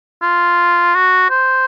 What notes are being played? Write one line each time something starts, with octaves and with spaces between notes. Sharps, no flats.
F4
F#4
C5